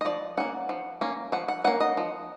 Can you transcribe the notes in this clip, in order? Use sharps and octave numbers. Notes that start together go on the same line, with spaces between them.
D#5
F3 D5
A#3 C#4 F#5
F3
A#3 C#4
F3 F#5
F#5
A#3 C#4 F#5
D#5
F3